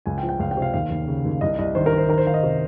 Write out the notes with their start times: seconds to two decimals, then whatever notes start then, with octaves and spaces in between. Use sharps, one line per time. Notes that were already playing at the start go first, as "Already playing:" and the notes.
0.06 C#2 G#5
0.18 G5
0.23 F3
0.29 G5
0.39 C#2 F5
0.51 G5
0.57 C3
0.62 F5
0.74 D#2 F5
0.90 D#2
1.08 C#3
1.25 D#2
1.41 C2 D#5
1.59 C2 D#5
1.75 D#3 C5
1.86 A#4
1.92 D#3
1.98 C5
2.08 D#3 A#4
2.18 C5
2.26 D#3 F5
2.34 D#5
2.43 C3